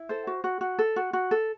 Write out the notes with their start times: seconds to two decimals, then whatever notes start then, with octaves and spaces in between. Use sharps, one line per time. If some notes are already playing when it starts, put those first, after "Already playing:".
Already playing: E4
0.09 A4 C5
0.27 F#4
0.44 F#4
0.61 F#4
0.79 A4
0.96 F#4
1.13 F#4
1.31 A4